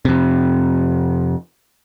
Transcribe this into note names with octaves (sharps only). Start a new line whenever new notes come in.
F2 C3